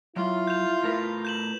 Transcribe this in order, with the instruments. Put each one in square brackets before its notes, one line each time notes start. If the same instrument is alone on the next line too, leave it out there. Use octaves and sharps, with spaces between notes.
[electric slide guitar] F#3 [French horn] E4 [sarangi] F4
[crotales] G6 F7
[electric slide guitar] A2 A#4 B4
[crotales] G6 E7 F#7